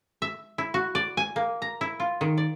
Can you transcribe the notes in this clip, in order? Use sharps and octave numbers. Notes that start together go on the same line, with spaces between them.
E5
E4
F#4
D5
G#5
A#3
A#5
E4
F4
D#3
D5